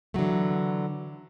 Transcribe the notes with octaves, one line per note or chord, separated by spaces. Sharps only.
D3 E3 F#3 A3